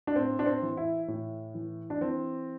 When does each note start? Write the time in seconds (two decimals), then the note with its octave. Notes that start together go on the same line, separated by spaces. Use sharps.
0.07 D4
0.16 A2 C4
0.39 D4
0.46 C4
0.62 E3
0.77 E4
1.08 A2
1.54 E3
1.90 D4
2.01 E3 C4